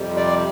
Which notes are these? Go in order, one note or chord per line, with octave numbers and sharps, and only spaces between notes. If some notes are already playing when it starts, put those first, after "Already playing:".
Already playing: F2 C3 G3
D5